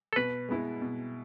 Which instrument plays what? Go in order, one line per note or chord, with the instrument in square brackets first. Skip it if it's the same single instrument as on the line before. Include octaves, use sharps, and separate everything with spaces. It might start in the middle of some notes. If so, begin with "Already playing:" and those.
[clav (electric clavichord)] A4
[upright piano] B2 [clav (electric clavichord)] B4
[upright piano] G#3 B3 E4
B2